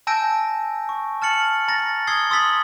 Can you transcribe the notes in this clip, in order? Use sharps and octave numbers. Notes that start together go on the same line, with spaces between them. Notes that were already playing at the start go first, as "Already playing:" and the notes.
G#5 A5 E6 G6 A#6 D7
C#6
A5 F6 A6 C#7 F#7
A#5 A6 A#6
D#6 E6 G#6 C7 G7
C6 D#6 E6 A6 B6 F#7